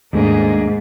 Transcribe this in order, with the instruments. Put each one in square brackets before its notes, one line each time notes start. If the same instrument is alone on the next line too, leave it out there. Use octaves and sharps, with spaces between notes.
[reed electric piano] D#2 A3 D4 [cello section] G#2 [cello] A#3 G#4